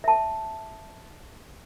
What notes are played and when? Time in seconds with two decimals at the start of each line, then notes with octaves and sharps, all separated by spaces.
0.04 E5 A5